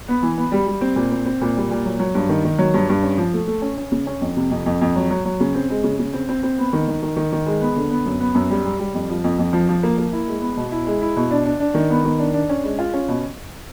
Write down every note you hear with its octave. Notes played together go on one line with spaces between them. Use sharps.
B3
E3
B3
G3
G3
C4
A#2
C4
C4
A#2
G3
A#2
F#3
F#3
G2
D#3
D#3
F#3
G2
G2
C#4
F3
A3
A3
C#4
C#4
C#3
C#4
F2
C3
F2
F2
F2
F#3
F#3
F#3
C#3
C4
G#3
C#3
C#3
C4
C4
C4
B3
D#3
D#3
D#3
D#3
D#3
G#3
B3
D3
B3
F#2
B3
F#2
G3
G3
G3
F2
F3
F2
F2
F3
F3
A#3
A#3
E4
G#3
B3
B2
E4
G#3
E4
B2
D4
D4
D4
D#3
B3
D#3
D4
D4
C#4
G#3
F4
C#4
B2